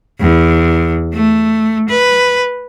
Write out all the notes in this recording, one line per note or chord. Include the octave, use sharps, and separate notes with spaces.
E2
A3
B4